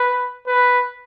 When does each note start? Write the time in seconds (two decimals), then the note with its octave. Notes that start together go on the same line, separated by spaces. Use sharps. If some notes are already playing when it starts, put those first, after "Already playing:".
Already playing: B4
0.47 B4